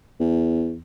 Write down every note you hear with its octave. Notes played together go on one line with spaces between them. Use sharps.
E2